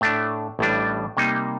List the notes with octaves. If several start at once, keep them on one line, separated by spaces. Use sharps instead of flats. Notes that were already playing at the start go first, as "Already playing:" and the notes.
A2 A3 D4
A1 A2 G3 D4
C3 G3 A#3 D#4